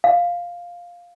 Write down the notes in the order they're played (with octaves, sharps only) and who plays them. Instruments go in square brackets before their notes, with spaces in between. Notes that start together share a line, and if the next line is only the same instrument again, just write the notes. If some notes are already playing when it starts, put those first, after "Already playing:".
[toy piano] F5